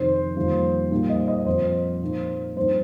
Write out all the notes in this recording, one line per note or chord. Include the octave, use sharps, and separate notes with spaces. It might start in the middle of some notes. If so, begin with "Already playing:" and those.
Already playing: F2 C3 D#3 C4 C5
F2 D#3 G3 A#3 F4
A#2 G3 A#3 D#4
D#5
D#5
F2 F3 C4 F4 C5
A#2 A#3 D#4
G2 F3 C4 D#4 C5